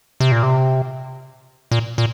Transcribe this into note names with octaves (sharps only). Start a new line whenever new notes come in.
C3
A#2
C3
A#2
A#2